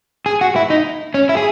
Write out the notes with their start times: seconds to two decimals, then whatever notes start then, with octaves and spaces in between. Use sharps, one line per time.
0.26 G#4
0.41 F#4
0.56 E4
0.70 D#4
1.14 C#4
1.29 E4
1.37 G#4